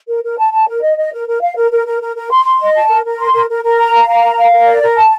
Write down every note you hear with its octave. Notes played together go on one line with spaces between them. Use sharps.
A#4
A#4
A5
A5
A#4
D#5
D#5
A#4
A#4
F5
A#4
A#4
A#4
A#4
A#4
C6
C6
D#5
A5
A#4
A#4
C6
A#4
A#4
A#4
A#5
F5
A#5
A#4
F5
A#4
D5
A#4
A5